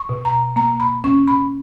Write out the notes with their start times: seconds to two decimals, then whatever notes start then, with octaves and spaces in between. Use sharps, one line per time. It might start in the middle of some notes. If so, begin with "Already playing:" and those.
Already playing: C#6
0.09 B2
0.25 A#5
0.56 A#3 A#5
0.80 B5
1.04 C#4 C#6
1.28 B5